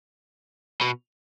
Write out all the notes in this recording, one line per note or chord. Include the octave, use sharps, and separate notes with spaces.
B2